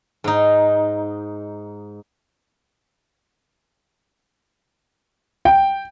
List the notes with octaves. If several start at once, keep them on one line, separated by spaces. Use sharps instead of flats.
G#2 D#4
G5